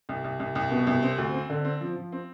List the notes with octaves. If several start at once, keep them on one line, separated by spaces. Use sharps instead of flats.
C2
C2
C2
C2
B2
C2
C4
D2
C4
D3
C4
F3
F3
C4